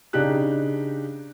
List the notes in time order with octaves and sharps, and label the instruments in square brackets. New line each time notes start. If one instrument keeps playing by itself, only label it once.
[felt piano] C#3 D4 D#4 G4 F#6